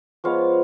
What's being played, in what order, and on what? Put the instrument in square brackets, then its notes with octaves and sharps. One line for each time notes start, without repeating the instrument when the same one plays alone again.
[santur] F3 G#3 B3 F4 C#5 F5